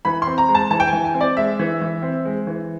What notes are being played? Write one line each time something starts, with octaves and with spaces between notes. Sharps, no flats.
E3 B5
C6
C4
A#5
G#3
A5
E3 A5
G5
G#5
E3
G#5
C4
D5
G#3 E5
E3
E3
C4
G#3
E3